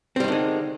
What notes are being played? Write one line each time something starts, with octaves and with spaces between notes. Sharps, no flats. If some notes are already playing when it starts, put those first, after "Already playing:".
D3 D#3 G3 G#3 C4